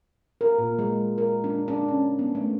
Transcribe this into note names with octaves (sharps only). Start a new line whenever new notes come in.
A#4
A#2
G#3
A#4
D4
D4
C#4
B3
A3